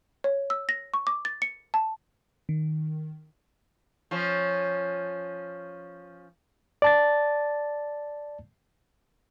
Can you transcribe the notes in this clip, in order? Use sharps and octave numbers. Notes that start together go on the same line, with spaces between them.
C#5
E6
A#6
C#6
D6
A6
C#7
A5
D#3
F3 C#4
D5 A5 A6